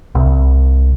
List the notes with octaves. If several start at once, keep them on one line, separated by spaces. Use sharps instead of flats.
C2